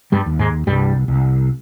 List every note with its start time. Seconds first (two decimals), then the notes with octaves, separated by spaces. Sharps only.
0.12 G2 G3
0.26 D#2
0.39 G#2 G#3
0.67 C2 G2 G3
1.08 C2